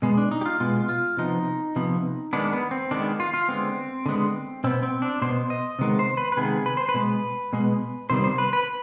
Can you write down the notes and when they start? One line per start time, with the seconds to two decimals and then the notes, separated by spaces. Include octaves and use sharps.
0.02 B2 G#3 B3
0.18 D4
0.31 D#4
0.41 G4
0.45 F4
0.60 B2 G#3 B3 F4
0.89 F4
1.17 C3 F3 B3 D#4
1.76 C3 F3 B3
2.33 D#3 G#3 B3 D4
2.53 B3
2.71 C4
2.91 D#3 G#3 B3 D4
3.20 F4
3.34 F4
3.49 D3 G#3 B3 C4
4.06 D3 G#3 B3
4.64 B2 B3 C4
4.83 C4
5.02 D4
5.22 B2 B3 C5
5.50 D#5
5.79 C3 D#3 G#3 B3
5.99 C5
6.17 B4
6.32 B4
6.37 C3 D#3 G#3 B3 G#4
6.66 B4
6.77 C5
6.89 B4
6.94 B2 G#3 B3
7.53 B2 G#3 B3
8.10 C3 D#3 G3 B3 C5
8.24 C5
8.38 B4
8.53 B4